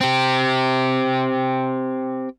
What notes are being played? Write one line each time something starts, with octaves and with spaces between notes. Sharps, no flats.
C4 G4